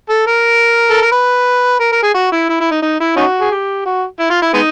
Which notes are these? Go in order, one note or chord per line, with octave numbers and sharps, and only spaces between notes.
A4
A#4
A4
A#4
B4
A#4
A#4
G#4
F#4
E4
E4
E4
D#4
D#4
E4
C#4 D#4 F#4
G#4
G4
F#4
E4
F4
E4
G#3 B3 D#4